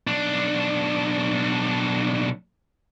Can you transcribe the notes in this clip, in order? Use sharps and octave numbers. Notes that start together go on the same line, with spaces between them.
B1 D4